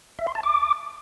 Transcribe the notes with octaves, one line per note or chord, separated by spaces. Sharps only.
E5
C6
A5
D6